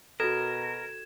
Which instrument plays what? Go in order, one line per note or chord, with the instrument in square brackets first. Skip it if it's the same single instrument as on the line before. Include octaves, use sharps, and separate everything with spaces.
[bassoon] B2 [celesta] F#4 A4 [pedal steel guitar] A#4 [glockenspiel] G#6 E7